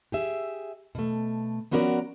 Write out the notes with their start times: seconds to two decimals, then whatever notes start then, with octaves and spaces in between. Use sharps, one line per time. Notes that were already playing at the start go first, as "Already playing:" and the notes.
0.12 G4 G#4 E5
0.95 B2 A3
1.71 F3 B3 C#4 F#4 A#4 D5